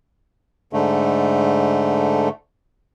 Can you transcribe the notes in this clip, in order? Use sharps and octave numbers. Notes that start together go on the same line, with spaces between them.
G#2 D3 A3